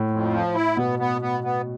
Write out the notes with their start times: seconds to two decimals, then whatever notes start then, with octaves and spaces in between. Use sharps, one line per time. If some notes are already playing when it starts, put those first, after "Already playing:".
Already playing: A2
0.11 F2
0.33 F3
0.55 E4
0.77 B2 B3
0.99 B3
1.22 B3
1.44 B3